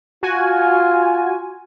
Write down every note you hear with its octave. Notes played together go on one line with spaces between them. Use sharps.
F4 F#4 G#5